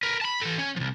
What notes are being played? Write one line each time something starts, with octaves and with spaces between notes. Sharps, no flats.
A#4 B4
A5 B5
E3 A4
C#4
C2 F3